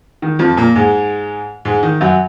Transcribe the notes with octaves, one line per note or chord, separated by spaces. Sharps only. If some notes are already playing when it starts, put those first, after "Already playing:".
D#3
F2 F3
A#2 A#3
G#2 G#3
G#2 G#3
D#3
F#2 F#3